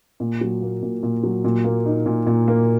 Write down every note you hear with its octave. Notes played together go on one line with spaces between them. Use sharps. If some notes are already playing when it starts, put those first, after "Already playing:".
A#2
F#3
A#3
A#2
A#2
F#3
A#2
A#3
D#4
A#2
A#2
A#3